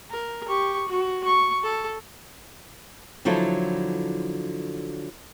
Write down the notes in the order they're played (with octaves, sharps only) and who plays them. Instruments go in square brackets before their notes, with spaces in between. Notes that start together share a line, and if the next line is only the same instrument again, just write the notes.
[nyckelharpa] A#4
G4 C#6
F#4
C#6
A4
[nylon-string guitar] D3 F3 F#3 E4 A4